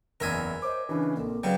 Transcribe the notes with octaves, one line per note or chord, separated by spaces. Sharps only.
F#1 E2 A#4 E5 G#5
C5 C#5 D#5 D6
C#3 E3 D4
A#1 A#3 C4 A4 A#4
C#3 F#3 B4 D5 F5 G5